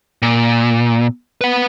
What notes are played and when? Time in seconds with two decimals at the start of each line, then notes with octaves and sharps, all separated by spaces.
0.22 A#2
1.41 B4 F#5